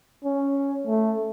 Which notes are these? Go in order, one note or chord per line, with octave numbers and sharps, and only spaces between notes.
C#4
A3